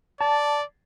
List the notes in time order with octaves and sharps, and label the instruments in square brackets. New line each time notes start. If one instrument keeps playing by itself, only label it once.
[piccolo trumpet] D5 [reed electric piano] A5